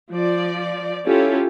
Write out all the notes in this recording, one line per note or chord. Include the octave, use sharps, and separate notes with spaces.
F3 D5
C#4 E4 F4 G4 A4